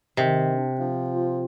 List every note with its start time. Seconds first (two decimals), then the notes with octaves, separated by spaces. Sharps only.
0.17 C3 D#3
0.48 D4
0.79 F3
1.10 F4